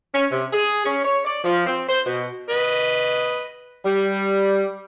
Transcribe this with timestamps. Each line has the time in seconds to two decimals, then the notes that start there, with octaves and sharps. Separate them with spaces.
0.14 C#4
0.31 C3
0.53 G#4
0.85 C#4
1.04 C#5
1.25 D5
1.44 F3
1.66 C4
1.89 C5
2.06 B2
2.50 B4 D#5
3.85 G3